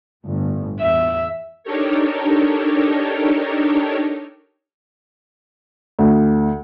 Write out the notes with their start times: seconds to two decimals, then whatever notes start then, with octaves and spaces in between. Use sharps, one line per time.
0.25 G1 A2
0.81 E2 E5
1.64 D4 D#4 G4 A4 A#4 C#5
5.99 D2